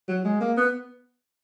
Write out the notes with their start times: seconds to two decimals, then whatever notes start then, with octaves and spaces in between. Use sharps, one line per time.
0.08 F#3
0.25 G#3
0.41 A#3
0.57 B3